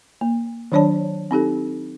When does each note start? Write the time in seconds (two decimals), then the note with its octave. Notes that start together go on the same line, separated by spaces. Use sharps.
0.21 A#3
0.72 D#3 F#3 D4 C#5 D5 A5
1.31 C4 D#4 G4 A4